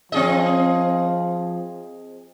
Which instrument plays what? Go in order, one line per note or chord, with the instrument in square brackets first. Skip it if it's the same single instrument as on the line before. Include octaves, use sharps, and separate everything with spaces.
[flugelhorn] F3 [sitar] C4 G#4 D#5